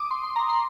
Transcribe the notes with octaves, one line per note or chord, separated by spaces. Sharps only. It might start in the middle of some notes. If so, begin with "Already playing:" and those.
Already playing: D6 D#6
C6
C6
A#5
C6